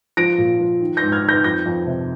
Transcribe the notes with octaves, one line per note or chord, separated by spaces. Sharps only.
F3 A#6 D7
A#2
F3
D#3
G#2 G6 A#6
F6 G#6
D#3
G6 A#6
F2 G6 A#6
F2
C3